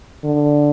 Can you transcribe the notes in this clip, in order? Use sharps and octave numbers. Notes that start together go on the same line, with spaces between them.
D3